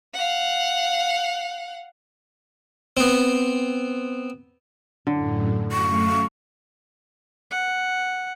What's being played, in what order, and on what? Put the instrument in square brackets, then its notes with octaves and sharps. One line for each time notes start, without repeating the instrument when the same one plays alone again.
[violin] F5 F#5
[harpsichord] B3 C4
[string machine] F#2 A2 [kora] D3
[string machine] F#2 A3 F5 [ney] C#6
[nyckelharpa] F#5